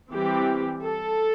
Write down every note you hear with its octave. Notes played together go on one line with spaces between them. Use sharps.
E3 G3 C4 G4
A4